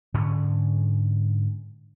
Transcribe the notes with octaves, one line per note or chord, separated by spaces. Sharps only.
G#2 D3 C#4